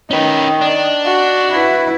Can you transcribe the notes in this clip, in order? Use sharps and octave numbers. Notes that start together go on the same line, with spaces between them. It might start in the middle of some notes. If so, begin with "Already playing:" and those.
D#3 C#4 B4
D4
F#4
E4 B4